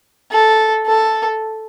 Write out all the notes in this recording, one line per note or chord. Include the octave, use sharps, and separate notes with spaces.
A4
A4